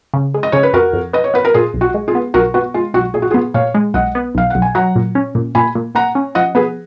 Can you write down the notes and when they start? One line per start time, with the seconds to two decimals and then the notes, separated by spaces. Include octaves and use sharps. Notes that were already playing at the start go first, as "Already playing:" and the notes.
0.14 C#3
0.34 G#3
0.43 D#5
0.52 C#3 C#5
0.63 B4
0.73 F2 F#4 A#4
0.93 F2
1.13 B3 D#5
1.24 C#5
1.34 B3 B4
1.45 A#4
1.54 A#2 F4 G#4
1.74 B1
1.81 F#4
1.94 G#3
2.08 F4 G#4
2.15 B3
2.34 B1 F#4 A#4
2.54 B3 F#4
2.74 G#3 F4
2.94 B1 F#4
3.14 A#2 G#4
3.22 F#4
3.30 F4 G#4
3.34 B3
3.54 A#2 C#5 F5
3.74 G#3
3.94 B1 D#5 F#5
4.15 B3
4.35 B1 F5
4.50 B1 F#5
4.62 G#5
4.75 F#3 F#5 A#5
4.96 A#2
5.15 C#4
5.35 A#2
5.55 A#2 G#5 B5
5.75 A#2
5.95 A#2 F#5 A#5
6.15 C#4
6.35 F3 D#5 F#5
6.55 B3 G#4 B4